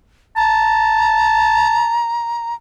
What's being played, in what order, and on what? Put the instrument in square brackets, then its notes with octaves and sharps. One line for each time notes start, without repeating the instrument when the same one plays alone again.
[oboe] A5 [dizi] A#5